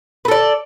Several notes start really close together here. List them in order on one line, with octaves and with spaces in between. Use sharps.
B4 A4 D5